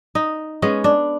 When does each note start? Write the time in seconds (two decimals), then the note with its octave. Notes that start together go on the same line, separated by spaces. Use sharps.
0.15 D#4
0.62 G#3 B3 C#4
0.84 D4